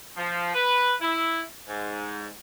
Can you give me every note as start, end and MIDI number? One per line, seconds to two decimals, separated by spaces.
0.17 0.53 53
0.54 0.93 71
1.00 1.42 64
1.68 2.27 44